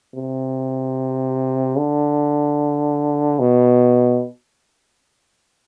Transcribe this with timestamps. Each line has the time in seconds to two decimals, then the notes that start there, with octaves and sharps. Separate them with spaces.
0.15 C3
1.78 D3
3.40 B2